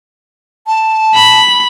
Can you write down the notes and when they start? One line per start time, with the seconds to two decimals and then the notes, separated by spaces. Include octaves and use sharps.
0.67 A5
1.14 B5